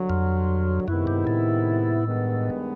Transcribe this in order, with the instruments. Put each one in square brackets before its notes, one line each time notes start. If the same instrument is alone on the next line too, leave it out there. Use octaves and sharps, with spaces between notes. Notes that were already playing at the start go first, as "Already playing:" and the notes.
Already playing: [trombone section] G2 D3 F#3
[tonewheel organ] F2
[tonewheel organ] F#2 [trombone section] C3 D#3 G#3 B3 E4
[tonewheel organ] G2
A2
[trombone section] G2 D#3 G#3 B3